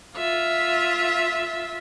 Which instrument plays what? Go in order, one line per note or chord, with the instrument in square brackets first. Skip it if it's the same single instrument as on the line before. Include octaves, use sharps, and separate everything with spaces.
[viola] F4 E5